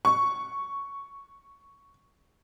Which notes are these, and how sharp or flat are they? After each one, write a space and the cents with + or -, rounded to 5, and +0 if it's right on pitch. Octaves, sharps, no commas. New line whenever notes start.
C#6 +0